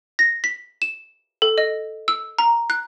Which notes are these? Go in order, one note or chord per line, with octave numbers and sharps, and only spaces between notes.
A#6
B6
E7
A4
D#5
E6
A#5
F#6